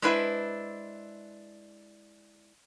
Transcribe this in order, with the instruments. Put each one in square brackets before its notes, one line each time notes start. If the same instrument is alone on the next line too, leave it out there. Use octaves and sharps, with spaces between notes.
[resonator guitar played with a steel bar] G#3 D4 E4 B4 C5 E5